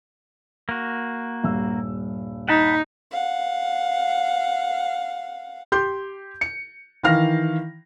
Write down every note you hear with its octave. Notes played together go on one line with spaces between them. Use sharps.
A#3 F#4
D#1 G2 E6
D#4 F#5 A5 B5
F5 F#5
G4 C6 G6
C#7
D#3 E3 F5 F6 A#6